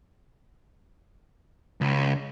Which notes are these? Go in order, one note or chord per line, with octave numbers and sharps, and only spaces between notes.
C#2